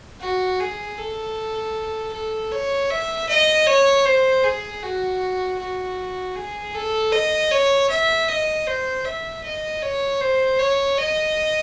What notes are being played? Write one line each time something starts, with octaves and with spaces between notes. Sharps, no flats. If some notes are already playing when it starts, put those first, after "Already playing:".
F#4
G#4
A4
A4
C#5
E5
D#5
C#5
C5
G#4
F#4
F#4
G#4
A4
D#5
C#5
E5
D#5
C5
E5
D#5
C#5
C5
C#5
D#5